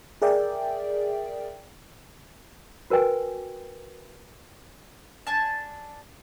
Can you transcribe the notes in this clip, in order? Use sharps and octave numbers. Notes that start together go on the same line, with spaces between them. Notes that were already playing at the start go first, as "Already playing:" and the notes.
G#4 A#4 D5 E5 G5
F#4 A#4 B4 G5 G#5
D4 G#5 A5